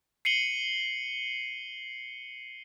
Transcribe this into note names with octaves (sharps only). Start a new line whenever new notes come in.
C7 C#7 D#7 F#7 G7